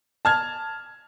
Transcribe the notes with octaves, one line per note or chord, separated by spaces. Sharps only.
A5 F6 G#6